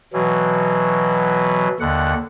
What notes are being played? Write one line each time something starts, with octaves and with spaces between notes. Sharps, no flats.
B2 E3 F#3
D#2 D3 F#5